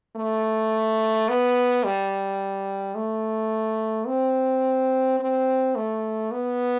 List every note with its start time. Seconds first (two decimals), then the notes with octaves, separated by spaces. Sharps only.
0.17 A3
1.29 B3
1.84 G3
2.95 A3
4.07 C4
5.20 C4
5.76 A3
6.32 B3